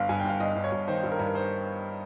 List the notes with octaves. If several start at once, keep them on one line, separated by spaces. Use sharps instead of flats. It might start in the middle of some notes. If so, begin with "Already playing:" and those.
Already playing: G1 F5
G2 G#5
G5
G1 F5
G1 D#5
G1
C#5
G2
D#3 C5
G2
A#4
G2
A#4
C5